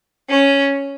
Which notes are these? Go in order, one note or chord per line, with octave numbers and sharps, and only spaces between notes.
C#4